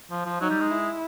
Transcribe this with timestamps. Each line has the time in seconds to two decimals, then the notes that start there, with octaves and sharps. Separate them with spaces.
0.10 F3
0.25 F3
0.41 F#3 D#4
0.50 G3
0.60 G#3
0.71 E4